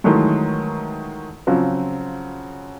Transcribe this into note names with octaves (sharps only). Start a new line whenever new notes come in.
D#3 E3 F#3 G#3 A3
C#3 F3 F#3 C4